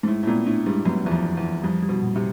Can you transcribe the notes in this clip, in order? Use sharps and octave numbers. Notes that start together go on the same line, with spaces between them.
G#2
A2 G#3
A2
A#2 B3
A2 D4
G2 G#3
F#2 B3
E2 F3
F2
F3
E2
F3
F2 G3
G3
B2
A#2
C3